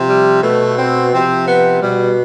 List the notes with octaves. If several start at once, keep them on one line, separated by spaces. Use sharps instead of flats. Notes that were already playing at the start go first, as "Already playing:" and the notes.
Already playing: C3 F3
G3
B2 A3
C4
C3 F3 C4
B3
B2 G3